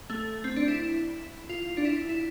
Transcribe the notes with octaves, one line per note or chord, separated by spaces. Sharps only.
A3
C4
D4
E4
F4
D4
E4
E4